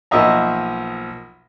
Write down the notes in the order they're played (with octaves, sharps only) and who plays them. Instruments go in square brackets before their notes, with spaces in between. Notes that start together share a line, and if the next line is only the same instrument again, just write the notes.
[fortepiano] B1 F3 A#3 D#5 E5 A#5